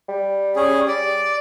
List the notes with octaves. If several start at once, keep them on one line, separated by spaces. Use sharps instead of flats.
G3
C#4 G#4
D5